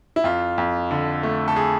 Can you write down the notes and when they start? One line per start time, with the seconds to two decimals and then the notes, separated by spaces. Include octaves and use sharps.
0.16 E4
0.24 F2 F4
0.58 F2
0.91 D3
1.23 A3
1.48 A4
1.56 G#4